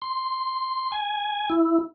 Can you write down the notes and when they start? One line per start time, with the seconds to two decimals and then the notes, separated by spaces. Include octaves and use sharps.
0.02 C6
0.92 G#5
1.50 E4